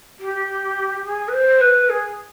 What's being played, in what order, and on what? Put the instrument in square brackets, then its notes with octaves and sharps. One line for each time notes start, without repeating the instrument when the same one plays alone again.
[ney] G4
G#4
B4
C5
B4
G#4